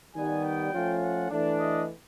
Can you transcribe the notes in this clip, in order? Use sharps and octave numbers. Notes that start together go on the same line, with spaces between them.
D#3 G3 B3 G#5
G5
F3 A3 C#4 F4
F#5
E3 A3 D4
D#5